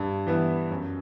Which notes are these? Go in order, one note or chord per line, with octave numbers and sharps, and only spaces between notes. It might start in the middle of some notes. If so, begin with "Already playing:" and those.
Already playing: G2
E3 B3 E4
F#2